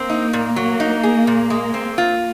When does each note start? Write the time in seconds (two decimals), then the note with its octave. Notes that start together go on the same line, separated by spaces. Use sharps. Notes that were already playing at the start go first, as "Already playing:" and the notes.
Already playing: A#3 C4
0.10 D#4
0.33 A#2
0.56 F#3
0.80 D#4
1.03 G#4
1.27 A#2
1.50 G#3
1.74 C4
1.98 F4